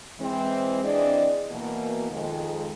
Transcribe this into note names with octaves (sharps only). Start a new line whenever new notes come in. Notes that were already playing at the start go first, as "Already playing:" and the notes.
E3 G#3 C4
E3 C4 D4 G#4 D5 D#5
B2 E3 A#3
F2 D#3 G#3